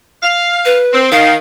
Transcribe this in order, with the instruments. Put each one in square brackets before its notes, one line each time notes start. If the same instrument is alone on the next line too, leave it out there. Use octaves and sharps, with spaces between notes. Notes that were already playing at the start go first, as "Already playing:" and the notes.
[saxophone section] F5
[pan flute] B4
[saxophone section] C4
[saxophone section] D#3 [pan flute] F5